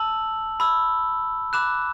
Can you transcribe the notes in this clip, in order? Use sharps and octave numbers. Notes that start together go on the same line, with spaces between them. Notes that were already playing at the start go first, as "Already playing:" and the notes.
Already playing: A5 E6 F#7
B5 E6
B5 D6 F#6 E7